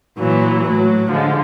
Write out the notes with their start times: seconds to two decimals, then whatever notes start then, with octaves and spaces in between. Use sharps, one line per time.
0.19 A#2 E3 F#3
0.67 A2 F#3
1.10 D3 F3 G#3